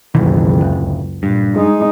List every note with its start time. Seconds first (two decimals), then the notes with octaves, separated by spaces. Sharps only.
0.15 F#1 C#2 B2 D#3 E3
0.61 D1
1.23 G2 A#2
1.55 G#3 D#4